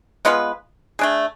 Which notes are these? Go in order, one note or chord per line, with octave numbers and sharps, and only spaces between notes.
G#3 B3 F4 B4
A3 D4 G#4